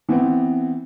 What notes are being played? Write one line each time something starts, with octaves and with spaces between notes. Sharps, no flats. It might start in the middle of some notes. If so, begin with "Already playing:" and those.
E3 B3 C4